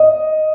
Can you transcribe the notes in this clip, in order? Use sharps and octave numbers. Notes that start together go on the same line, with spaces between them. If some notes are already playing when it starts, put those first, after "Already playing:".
Already playing: D#5